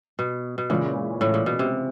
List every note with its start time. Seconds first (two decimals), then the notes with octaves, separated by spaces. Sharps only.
0.19 B2
0.58 B2
0.70 A#2 C#3 E3 G#3 C#4 F4
1.21 A2
1.34 A#2
1.46 B2
1.59 C3